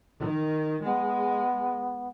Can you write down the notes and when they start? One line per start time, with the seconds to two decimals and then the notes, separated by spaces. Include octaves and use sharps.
0.20 D#3
0.84 G#3 B3